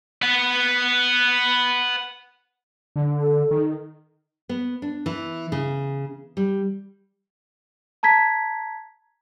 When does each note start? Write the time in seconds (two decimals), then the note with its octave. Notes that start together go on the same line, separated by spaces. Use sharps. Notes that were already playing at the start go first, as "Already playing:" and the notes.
0.22 B4 F#5
2.96 D3
3.21 A4
3.51 D#3
4.49 B3
4.82 D4
5.06 E3
5.52 C#3
6.37 G3
8.03 A5 A#5 G#6 B6